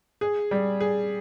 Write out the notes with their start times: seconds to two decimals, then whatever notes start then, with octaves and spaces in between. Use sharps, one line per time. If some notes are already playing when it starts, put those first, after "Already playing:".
0.21 G#4
0.51 G3
0.80 G#4